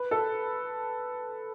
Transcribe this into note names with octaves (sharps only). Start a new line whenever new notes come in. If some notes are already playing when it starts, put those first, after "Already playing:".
Already playing: B4
A4